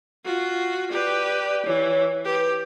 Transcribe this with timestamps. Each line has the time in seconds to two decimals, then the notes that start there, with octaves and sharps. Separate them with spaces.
0.25 F4 F#4
0.91 G4 B4 D5
1.66 E3 C#5
2.24 G4 B4